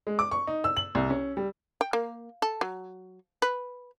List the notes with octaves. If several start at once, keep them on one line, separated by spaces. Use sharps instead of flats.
G#3
D6
C#6
D#4
E6
F#7
C2
C#4
G3
G5
A#3
A4
F#3
B4